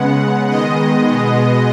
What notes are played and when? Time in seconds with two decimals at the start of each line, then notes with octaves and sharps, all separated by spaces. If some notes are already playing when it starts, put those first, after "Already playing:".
Already playing: C#3 G#3 B3 F#5
0.50 D#3 G#3 B3 D#5
1.07 B2 G#3 B3